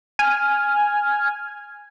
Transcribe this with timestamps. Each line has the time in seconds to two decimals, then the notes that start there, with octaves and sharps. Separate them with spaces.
0.19 G#5 F6